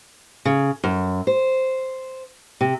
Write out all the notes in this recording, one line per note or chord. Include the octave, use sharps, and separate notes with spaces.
C#3
F#2
C5
C3